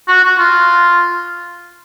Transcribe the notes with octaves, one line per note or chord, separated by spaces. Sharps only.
F#4
F#4
F4